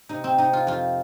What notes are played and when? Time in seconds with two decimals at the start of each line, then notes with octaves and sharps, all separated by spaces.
0.09 C3 D#4
0.24 C4
0.38 C3 D#4
0.53 F4
0.67 F2 F4